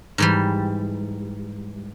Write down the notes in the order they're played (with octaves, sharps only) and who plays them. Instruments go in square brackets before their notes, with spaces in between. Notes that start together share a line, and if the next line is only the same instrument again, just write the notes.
[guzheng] G#2 E3 G3